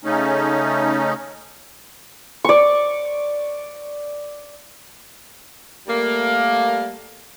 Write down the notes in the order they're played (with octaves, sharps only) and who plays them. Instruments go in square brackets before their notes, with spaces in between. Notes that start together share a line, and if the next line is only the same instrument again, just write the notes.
[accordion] C#3 A3 C#4 D#4
[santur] D5 C#6
[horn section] G3 A3 A#3